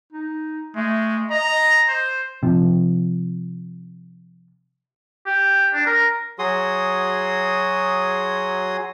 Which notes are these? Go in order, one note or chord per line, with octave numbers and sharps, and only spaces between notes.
D#4
G#3 A3
D#5 A#5
C5
C3 F3
G4
D4
A#4
F#3 F#4 G#4 C6 D#6